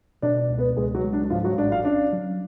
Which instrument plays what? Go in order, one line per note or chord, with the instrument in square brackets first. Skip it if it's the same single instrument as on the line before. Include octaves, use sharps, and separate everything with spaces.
[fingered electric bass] B2 [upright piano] D4 D5
[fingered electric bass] C#2
[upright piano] B3 B4
[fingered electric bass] C#2 [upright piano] G#3 G#4
[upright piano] F#3 F#4
[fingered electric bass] G#3
[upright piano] D4
D4
[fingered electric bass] G#2 [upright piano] F3 F4
[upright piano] F#3 F#4
[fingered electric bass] A1 [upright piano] D4 D5
[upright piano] F4 F5
[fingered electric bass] C#4 [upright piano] D4 D5
[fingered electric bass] F#3